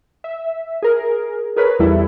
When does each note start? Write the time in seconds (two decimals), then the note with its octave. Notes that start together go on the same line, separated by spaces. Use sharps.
0.24 E5
0.82 G#4 A#4
1.56 G#4 A#4 B4 C#5
1.79 E2 G3 E4 A4